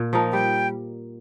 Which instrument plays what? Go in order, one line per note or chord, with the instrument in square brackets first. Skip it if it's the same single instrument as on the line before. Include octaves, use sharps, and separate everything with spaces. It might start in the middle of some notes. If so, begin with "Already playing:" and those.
Already playing: [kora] A#2
F3 D#4 A#4
[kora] G3 [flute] G5